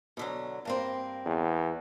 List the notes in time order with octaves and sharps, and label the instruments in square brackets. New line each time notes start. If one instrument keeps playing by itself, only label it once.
[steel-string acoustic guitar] B2 D3 F#3
G2 A#3 C4
[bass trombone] E2